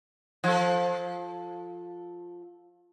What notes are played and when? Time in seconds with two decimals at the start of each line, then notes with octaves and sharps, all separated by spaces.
0.44 F3 A4